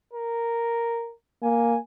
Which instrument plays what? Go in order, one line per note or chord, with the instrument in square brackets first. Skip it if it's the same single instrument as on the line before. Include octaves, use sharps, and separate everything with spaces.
[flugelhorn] A#4
[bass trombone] A#3 [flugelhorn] G#5